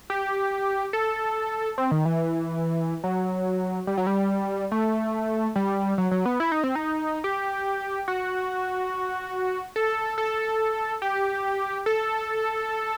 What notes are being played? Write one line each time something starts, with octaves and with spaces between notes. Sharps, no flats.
G4
A4
C4
D#3
E3
F#3
G3
F#3
G3
A3
G3
F#3
F#3
B3
E4
D#4
C4
D#4
G4
F#4
A4
A4
G4
A4